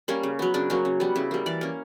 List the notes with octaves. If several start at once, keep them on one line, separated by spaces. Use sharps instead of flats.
G3 A#3 C#4
C#3
F#3 B3
C#3 D4
F#3 A#3 C#4
C#3
G3 B3
C#3 E4
G3 A#3
E3 D5
A#3 C#4